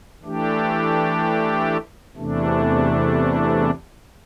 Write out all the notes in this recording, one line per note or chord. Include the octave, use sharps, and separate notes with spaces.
E3 A3 D4 G4
E2 C3 E3 A3 D4